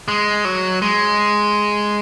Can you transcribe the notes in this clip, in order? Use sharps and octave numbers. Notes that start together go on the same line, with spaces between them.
G#3
F#3
G#3